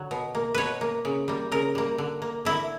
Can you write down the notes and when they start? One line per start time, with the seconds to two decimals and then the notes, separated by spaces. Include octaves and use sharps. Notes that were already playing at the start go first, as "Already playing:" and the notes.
Already playing: D3 F#3
0.11 B2
0.35 A#3
0.54 B2 B4 C#5
0.81 A#3
1.05 C#3
1.28 G3 A#3
1.52 C#3 A#4
1.75 G3 A#3
1.98 D3
2.22 A#3
2.45 D3 E4